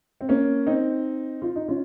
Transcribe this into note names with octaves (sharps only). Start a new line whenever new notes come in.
C4
A#3 C#4
C4 D#4
F4
D#4
C#4 F4